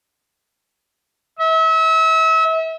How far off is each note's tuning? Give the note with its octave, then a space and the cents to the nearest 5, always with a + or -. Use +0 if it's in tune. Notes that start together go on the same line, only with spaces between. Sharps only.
E5 -35